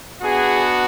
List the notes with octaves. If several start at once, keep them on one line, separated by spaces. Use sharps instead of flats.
B3 D4 F#4 G#4